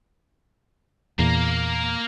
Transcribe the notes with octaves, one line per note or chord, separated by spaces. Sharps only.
E2 A#2 A#3 A#4